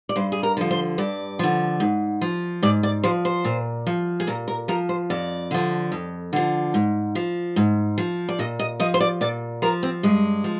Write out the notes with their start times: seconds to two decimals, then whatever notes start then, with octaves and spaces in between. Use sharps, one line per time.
0.09 D5
0.16 G2 C5
0.32 G#4
0.43 A#4
0.57 D3 F3
0.71 C5
0.98 G2 D5
1.39 D3 F3
1.80 G#2
2.21 F3
2.63 G#2 D5
2.83 D5
3.04 F3 C5
3.25 C5
3.45 A#2
3.87 F3
4.20 G#4
4.27 A#2 A#4
4.48 A#4
4.68 F3 A#4
4.89 C5
5.10 F2 D5
5.51 D3 F3
5.92 F2
6.33 D3 F3
6.74 G#2
7.15 F3
7.56 G#2
7.98 F3
8.29 D5
8.39 A#2 D#5
8.59 D#5
8.80 F3 D#5
8.94 C5
9.00 D5
9.21 A#2 D5
9.62 F3 A#4
9.83 C4
10.03 G2 G#3
10.44 F3